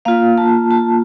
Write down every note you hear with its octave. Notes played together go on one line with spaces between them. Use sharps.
A#3 F4 F5
A5
A5